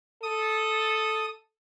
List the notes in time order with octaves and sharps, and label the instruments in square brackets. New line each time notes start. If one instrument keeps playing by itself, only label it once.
[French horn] A4 [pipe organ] D#6